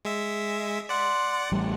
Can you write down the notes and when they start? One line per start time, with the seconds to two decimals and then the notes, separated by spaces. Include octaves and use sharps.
0.05 G#3 E5
0.89 D5 F#5 C6
1.52 A1 G3